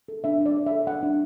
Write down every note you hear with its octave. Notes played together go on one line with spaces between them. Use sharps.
A4
D4 E5
D4
D5
C#5
A4 E5
D4 F#5
D4